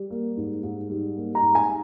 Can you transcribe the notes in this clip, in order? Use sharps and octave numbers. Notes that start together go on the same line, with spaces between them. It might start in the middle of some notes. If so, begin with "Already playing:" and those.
Already playing: G3
A#3
G#2
G#2
G3
A#3
A#5
G#2
G#5